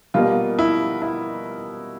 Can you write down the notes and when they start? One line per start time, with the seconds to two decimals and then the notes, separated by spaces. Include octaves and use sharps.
0.14 B2 G3 A#3 F4
0.59 E4
1.02 E4